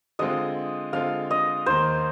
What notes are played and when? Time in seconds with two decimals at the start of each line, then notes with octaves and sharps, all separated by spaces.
0.19 D3 G#3 C4 F4 D#5
0.93 D3 G#3 C4 F4 F5
1.31 D#5
1.66 D#2 D#3 A#3 C5